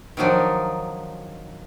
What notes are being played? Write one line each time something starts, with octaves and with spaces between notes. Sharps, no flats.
D#3 F3 F#3 D4 D#4